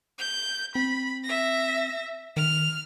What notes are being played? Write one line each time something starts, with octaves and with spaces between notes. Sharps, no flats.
G6
C4 B5
E5 A#6
D#3 F6